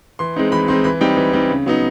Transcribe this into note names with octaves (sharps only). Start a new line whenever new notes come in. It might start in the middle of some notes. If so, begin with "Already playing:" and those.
E3 C6
G#3 C4 D#4
E3 B5
G#3 C4 D#4 C6
E3 B5
G3 C4 D#4 G5
E3
G3 C4 D#4
C#3
F#3 B3 D#4